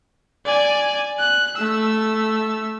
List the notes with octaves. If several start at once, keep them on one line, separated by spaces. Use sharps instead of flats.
D5 G#5
F#6
A3 E6